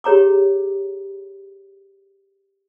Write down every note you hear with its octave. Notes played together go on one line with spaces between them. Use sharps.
G4 G#4 C#5 A#5 D6